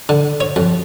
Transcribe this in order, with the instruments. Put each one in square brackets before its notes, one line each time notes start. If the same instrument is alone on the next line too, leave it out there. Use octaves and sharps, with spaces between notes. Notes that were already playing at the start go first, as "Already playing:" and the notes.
[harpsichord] D3
C#5
F2